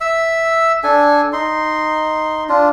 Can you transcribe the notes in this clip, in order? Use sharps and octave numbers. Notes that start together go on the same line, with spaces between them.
E5 E6
D4 A4 G#5
D#4 C6
D4 F4